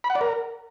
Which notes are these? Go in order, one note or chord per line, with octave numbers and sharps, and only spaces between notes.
B5
F#5
D5
A#4